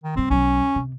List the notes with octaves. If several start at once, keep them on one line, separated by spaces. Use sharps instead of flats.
D#3
G2 C#3 C4
B1 F#3 C#4
C3